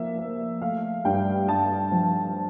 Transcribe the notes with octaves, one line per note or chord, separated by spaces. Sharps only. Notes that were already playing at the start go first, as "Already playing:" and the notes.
Already playing: F3 A#3 E5
A#3
A3 F5
G2 G5
G2 A5
F3